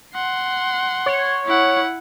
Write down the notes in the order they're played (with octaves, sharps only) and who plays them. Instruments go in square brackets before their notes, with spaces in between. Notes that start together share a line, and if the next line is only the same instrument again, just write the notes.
[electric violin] F#5 C6
[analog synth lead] C#5
[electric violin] E4 F#5